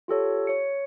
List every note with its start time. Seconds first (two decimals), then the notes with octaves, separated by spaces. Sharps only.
0.08 F4 G4 A4 C#5
0.47 C#5 C#7